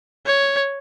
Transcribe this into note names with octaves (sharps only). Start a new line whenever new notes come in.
C#5